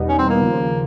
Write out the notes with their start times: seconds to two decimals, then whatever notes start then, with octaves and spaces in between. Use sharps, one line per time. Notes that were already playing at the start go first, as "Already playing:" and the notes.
Already playing: E2 B2 G3 B3 D#4
0.09 C#4
0.19 C4
0.30 A#3
0.41 D#2 C#3 F3